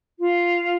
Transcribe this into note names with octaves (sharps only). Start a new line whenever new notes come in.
F4